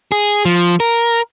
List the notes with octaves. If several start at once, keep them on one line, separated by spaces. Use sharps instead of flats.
G#4
F3
A#4